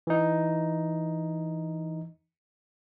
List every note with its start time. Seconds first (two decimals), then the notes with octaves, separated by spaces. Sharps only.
0.07 E3 D#4